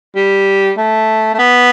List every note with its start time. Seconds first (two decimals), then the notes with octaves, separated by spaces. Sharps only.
0.16 G3
0.77 A3
1.34 A3
1.39 B3